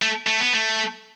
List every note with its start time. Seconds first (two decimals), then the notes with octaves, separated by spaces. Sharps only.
0.02 A3
0.27 A3
0.40 B3
0.53 A3